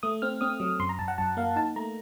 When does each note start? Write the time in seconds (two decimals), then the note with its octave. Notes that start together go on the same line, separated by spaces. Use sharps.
0.03 A3 D#6
0.22 C4 F6
0.41 C4 D#6
0.60 F#3
0.80 F#2 C6
0.89 A#5
0.99 F#2 A5
1.08 F#5
1.18 F#2 A5
1.37 A#3 F5
1.56 D#4 A5
1.76 A3 A#5